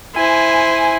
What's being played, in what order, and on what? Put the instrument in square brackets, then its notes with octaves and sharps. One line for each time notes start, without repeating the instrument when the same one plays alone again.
[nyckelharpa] E4 [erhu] C5 [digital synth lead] G#5